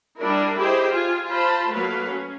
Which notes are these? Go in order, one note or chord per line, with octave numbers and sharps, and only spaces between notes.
G3 D4 E4 A#4
E4 G4 G#4 C5 D#5
F4 G#5
F4 C5 A5 B5
F#3 A3 A#3 B4 F5
C#4